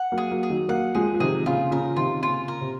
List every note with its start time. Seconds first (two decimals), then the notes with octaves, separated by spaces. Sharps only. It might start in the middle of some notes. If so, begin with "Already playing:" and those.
Already playing: F#5
0.12 F#3 A#3
0.18 G#4
0.31 F#3 A#3
0.43 G#4
0.50 D#3 F#3
0.69 F#3 A#3 F#5
0.95 F3 G#3 G#4
1.14 F3
1.20 C3 D#3 G#4
1.46 A#2 C#3 F4
1.71 A#2 C#3 A#4
1.96 C3 D#3 F4
2.22 A#2 C#3 F4
2.48 A#4
2.61 C3